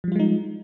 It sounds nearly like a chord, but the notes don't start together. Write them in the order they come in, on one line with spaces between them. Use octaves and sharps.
F3 G3 F4 G#3 D#4